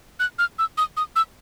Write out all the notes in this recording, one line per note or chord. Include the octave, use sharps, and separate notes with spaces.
F#6
F6
E6
D#6
D#6
E6